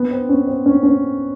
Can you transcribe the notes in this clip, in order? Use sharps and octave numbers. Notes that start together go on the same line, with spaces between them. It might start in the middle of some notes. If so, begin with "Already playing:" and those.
Already playing: B3
C4
C#4
C4
C#4
C#4